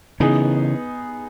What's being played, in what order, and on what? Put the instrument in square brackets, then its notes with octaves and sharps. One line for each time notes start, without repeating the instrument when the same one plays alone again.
[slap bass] C#3 E3 [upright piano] B3 D#4 G#4 B4